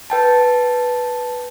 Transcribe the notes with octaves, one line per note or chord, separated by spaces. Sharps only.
B4 G5 A5